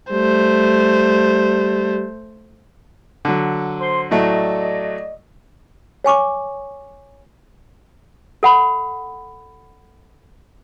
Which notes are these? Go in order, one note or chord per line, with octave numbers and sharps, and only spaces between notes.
G3 A3 C5
D3 F#3
C5 C6
A2 F#3 A3 D5 D#5
C#5 G#5 C#6 D6
A4 F#5 B5